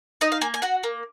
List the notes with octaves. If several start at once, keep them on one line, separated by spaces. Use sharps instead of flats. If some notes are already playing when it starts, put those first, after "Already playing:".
D#4 D#5
F5
A#3 G#5
G#5
F#4 F#5
A#3